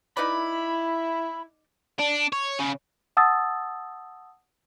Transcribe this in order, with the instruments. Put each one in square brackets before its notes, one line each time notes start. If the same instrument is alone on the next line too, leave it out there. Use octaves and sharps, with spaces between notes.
[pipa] D#4 B4 D5 [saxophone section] E4 [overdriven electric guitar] B5
[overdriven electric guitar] D4
C#5
C#3
[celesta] F#5 A5 D#6 E6 A6